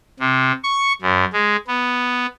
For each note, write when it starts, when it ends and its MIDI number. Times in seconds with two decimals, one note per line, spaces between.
0.19 0.52 48
0.64 0.93 85
1.01 1.25 42
1.33 1.56 56
1.67 2.26 59